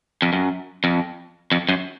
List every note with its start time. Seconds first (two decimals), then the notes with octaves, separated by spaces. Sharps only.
0.22 F2
0.33 F#2
0.84 F2
1.52 F2
1.69 F#2